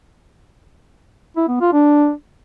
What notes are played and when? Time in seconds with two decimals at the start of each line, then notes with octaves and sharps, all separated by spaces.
1.37 E4
1.49 B3
1.61 F4
1.73 D4